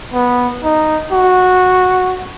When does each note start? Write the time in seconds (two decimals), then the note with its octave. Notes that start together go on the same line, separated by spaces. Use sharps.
0.14 B3
0.64 D#4
1.12 F#4